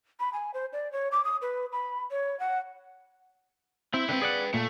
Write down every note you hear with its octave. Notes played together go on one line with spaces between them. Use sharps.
B5
G#5
C5
D5
C#5
D6
D#6
B4
B5
C#5
F#5
C4 E4
D3 C4 B4 G5
G#4 D5 F#5
A#2 A3